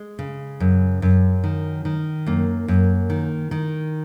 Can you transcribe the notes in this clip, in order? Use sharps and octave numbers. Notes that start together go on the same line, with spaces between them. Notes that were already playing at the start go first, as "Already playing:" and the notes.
Already playing: G#3
C#3
F#2
F#2
D#3
D#3
F#2 A#3
F#2
D#3
D#3